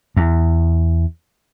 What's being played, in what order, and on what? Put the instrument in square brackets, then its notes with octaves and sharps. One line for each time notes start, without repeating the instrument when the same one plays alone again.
[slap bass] E2